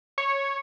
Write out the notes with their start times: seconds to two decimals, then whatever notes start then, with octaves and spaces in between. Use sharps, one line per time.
0.18 C#5